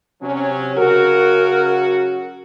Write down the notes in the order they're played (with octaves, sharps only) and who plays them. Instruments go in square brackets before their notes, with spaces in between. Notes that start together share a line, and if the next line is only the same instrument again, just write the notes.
[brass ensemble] C3 F#3 C#4
[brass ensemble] C#3 F#3 F#4 [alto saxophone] A#4